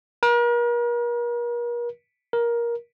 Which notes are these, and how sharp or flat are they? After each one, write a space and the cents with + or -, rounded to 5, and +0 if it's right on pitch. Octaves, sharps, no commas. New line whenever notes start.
A#4 +40
A#4 +15